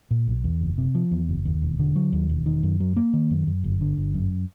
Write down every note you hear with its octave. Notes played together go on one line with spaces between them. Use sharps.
A#2
B1
E2
F#1
C3
F3
E2
F#1
D#2
E1
D3
F#3
D#2
E1
D#3
F#2
F#3
A#3
D#3
F#2
F#2
G1
D3
G1
F#2